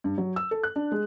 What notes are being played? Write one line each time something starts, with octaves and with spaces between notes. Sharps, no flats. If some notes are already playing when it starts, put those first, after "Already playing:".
G2
F#3
E6
A4
F#6
D4
G#3